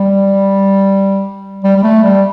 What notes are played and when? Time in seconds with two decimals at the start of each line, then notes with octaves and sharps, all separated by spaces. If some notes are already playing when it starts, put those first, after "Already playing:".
Already playing: G3
1.64 G3
1.76 G3
1.83 A3
2.03 G3